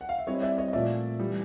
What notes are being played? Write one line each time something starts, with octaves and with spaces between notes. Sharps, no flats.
F#5
F5
E5
G3 C4 E4 C#5 D#5
D5 E5
C#5 D#5
D#5
A#2 F3 A3 D5 E5
E3 G3